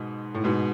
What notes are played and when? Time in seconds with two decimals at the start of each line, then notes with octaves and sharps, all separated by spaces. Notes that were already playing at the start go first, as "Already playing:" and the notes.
Already playing: G#2 B2
0.35 A2
0.44 G#2 B2